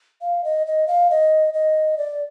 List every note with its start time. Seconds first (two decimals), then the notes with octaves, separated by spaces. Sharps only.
0.21 F5
0.44 D#5
0.67 D#5
0.87 F5
1.10 D#5
1.54 D#5
1.98 D5